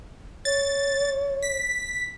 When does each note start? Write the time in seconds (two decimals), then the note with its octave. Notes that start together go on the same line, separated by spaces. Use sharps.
0.45 C#5 A6
1.43 B6